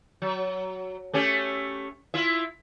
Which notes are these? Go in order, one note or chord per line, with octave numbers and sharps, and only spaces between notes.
F#3
A3 C#4 G4
E4 F4 E5